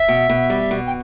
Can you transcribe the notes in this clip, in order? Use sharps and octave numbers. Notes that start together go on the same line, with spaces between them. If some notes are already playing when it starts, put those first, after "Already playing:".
Already playing: E5
B2
B2
G3
B2
G5